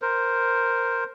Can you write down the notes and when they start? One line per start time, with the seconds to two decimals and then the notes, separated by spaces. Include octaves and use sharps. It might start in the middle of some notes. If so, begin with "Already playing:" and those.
0.02 A#4 C5